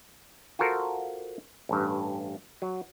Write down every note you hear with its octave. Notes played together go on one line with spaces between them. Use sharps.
F4 F#4 A4 A#4 C5
A1 G2
F#3